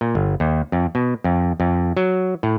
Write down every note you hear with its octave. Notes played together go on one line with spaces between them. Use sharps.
A#2
G1
D#2
F2
B2
F2
F2
F#3
A2